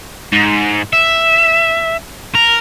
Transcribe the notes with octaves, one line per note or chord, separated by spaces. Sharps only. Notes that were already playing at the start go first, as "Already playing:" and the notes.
G#2
E5
A#4